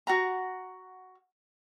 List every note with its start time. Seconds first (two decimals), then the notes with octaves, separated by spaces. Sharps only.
0.07 F#4 F#5 A#5